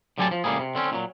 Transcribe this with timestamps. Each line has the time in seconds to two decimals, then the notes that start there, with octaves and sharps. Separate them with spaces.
0.18 A2 D3 F#3 G4 G#5 A5
0.31 F3
0.44 C#2 A2 G3 A#3 G#4
0.59 C3
0.75 D3 C4 C#4
0.91 A#2 D#3 F#3